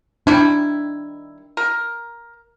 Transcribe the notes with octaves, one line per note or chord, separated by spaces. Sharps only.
D#3 G3 D4 E4
A#4